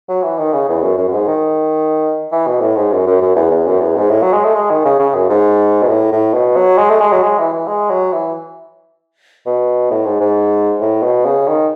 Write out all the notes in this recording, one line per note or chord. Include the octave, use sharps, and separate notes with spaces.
F#3
E3
D#3
C#3
E2
F#2
F#2
F#2
G#2
D#3
E3
B2
A2
G#2
F#2
F#2
F#2
E2
E2
F#2
E2
G#2
A2
F#3
G#3
A3
G#3
D#3
C#3
C#3
F#2
G#2
B2
A2
A2
B2
F#3
G#3
A3
G#3
F#3
G#3
E3
E3
G#3
F#3
E3
B2
A2
G#2
G#2
A2
B2
C#3
D#3